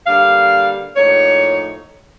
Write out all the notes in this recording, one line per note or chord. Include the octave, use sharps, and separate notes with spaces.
D3 G3 A#3 D4 F5
A2 F3 A#3 D#4 C#5